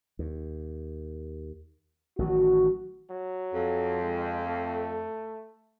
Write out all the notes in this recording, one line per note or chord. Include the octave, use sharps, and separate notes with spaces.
D#2
A1 D#3 F#3 F#4
F#3
F2
G#3
A3